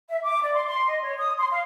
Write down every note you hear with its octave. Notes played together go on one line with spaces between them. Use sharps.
E5
D6
D5
C6
C6
D#5
C#5
D#6
C6
F5